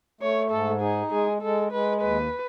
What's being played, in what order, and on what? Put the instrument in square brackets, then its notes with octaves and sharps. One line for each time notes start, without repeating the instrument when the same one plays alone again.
[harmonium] A3 [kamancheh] C#5
[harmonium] G#2 [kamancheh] A4
[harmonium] D#4 [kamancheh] G#4
[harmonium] G#3 [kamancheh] G#4
[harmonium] G#3 [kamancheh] A4
[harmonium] G#3 [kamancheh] B4
[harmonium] D#2 [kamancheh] B4